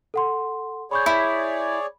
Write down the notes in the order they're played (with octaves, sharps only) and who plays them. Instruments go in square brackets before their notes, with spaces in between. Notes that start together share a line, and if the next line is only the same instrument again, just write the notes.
[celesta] A4 F#5 C6
[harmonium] G#4 C#5 D5 [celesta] B5 C#6 G6
[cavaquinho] E4 [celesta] G6 B6